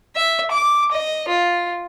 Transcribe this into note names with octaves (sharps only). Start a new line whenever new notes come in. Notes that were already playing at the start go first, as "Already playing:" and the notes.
E5
D6
D#5
F4